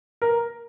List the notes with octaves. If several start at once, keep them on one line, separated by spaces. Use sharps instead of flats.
A#4